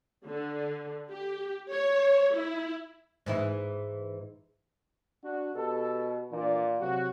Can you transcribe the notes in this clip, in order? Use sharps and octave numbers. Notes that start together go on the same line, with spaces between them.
D3
G4
C#5
E4
G#2 E3 E4
D4 F#4
B2 G4 A4
A#2 E3 D4 D5
C3 F#3 F#4